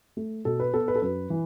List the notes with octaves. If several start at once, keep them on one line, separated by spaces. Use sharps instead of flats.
A3
B2 A4
B4
B3 A4
B4
A4
F#2 B4
E3